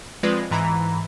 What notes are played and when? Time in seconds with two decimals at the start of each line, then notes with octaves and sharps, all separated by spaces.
0.23 F3 G#3 C4 F4 B4 D5
0.51 G#2 E3 A#5 B5